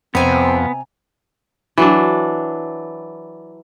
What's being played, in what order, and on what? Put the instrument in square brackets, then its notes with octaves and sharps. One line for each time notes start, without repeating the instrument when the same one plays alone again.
[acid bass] F2 [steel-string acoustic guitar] C3 G#5 A#5 [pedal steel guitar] B3 [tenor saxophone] C4
[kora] E3 F#3 D4